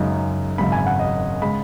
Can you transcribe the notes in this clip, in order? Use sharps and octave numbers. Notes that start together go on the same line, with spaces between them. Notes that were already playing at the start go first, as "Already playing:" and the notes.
Already playing: F#2 C#3 G#3 D#4
G#1 F#2 C#3 B5
G#5
F#5
D#5
C#3 G#3 B5